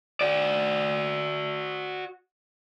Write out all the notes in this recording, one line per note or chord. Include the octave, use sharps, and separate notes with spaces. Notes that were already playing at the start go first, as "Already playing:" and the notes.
F#4 D5